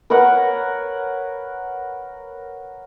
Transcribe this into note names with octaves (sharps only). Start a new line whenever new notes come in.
A#4 B4 C#5 F#5